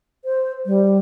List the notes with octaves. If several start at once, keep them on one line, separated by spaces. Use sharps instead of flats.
C5
G3